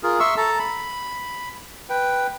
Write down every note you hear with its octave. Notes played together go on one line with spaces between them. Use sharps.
F4 G#4 A#4
E5 C6 C#6 E6
A4 A5 A#5
B5
B4 G5